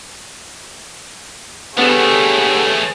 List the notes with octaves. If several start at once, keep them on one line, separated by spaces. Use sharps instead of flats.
D3 F3 G3 A3 B3 G#4 C#5 F#5